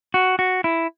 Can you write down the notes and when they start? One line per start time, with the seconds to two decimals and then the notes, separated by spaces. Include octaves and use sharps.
0.14 F#4
0.39 F#4
0.64 E4